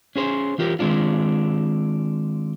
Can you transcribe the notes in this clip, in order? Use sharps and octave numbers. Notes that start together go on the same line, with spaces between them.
C#4 G#4 C5
E3 F4 G4 A#4
D#3 G#3 C4 D4 F4